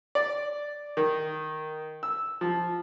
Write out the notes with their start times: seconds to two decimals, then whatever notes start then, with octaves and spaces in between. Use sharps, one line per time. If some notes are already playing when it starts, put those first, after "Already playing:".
0.15 D5
0.97 D#3
2.03 E6
2.41 F3